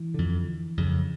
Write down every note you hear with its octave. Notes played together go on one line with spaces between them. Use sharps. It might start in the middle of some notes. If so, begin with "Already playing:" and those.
Already playing: E3
F2 D3
F2 C#3